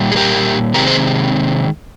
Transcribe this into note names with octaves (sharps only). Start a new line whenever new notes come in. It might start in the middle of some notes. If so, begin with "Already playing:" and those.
Already playing: A#2 G3 A#3
G#4
G4 A#4
C3 D#3 G#3 C4 G4 A#4
G#4 C5